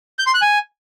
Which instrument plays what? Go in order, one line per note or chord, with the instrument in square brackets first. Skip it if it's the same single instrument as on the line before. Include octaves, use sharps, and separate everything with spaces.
[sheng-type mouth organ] G6
C6
F#6
G#5